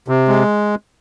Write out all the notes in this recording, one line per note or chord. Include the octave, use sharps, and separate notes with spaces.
C3
G#3